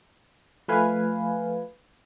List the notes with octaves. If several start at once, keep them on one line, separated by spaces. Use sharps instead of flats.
F3 A3 B4 F5 G#5